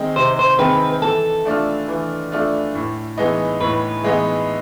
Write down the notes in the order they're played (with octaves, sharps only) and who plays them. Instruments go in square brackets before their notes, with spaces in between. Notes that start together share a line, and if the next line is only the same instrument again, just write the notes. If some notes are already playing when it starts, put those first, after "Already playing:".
Already playing: [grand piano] D#3 G#3 C4 D#4
[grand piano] C3 [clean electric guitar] C5
[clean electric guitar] C5
[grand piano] D#3 G#3 C4 D#4 [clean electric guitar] B4
[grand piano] E3 [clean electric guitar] A4
[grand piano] A3 D4 F4
E3
A3 D4 F4
A2
E3 G#3 B3 D#4
[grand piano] A2 [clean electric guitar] B4
[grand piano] E3 G#3 B3 D#4